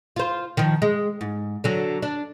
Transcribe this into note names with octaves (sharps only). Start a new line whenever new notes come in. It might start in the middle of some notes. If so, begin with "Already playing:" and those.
F4 C5
D#3 F3
G#3
G#2
D3 F#3
D4